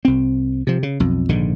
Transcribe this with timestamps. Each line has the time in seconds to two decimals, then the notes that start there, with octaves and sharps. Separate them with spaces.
0.05 C2 C4
0.67 C3 F3
0.83 C#3
1.00 B1 F2
1.29 A#1 G#2 D3 D#3